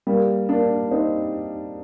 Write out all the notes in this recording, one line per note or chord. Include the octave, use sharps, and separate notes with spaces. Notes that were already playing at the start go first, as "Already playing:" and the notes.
G3 A#3
A#3 D4
C4 D#4